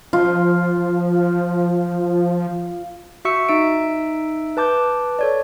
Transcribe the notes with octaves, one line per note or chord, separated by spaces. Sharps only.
F3 F4
F#4 E5 C#6 E6 C#7
D#4 E5 E6 D7
B4 A5 D6 G6
A4 C#5 D5